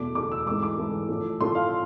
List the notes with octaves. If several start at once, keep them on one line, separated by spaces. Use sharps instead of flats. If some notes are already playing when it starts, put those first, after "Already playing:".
Already playing: E2 B2 A3 D6
E2 B2 A3 D6
E6
G#2 E3 A3 D6
D6
G#2 E3 A3
A2 F3 A3
A2 F3 A3 C6
F5